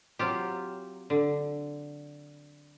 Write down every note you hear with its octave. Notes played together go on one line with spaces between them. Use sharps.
F#3 C4 F4 G4
D3